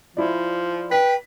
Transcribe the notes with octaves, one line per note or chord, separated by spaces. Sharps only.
F3 E4 D5
B4 G5 B6